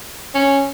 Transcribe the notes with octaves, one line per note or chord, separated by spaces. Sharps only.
C#4